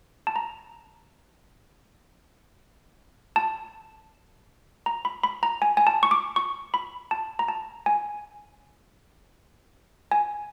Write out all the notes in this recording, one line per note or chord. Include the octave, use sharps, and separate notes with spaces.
A5
A#5
A5
A#5
B5
B5
A#5
G#5
G#5
A5
C#6
D6
C#6
B5
A5
A#5
A5
G#5
G#5